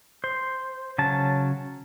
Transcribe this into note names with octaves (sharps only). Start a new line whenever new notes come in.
C5
C#3 F#3 C#4 A5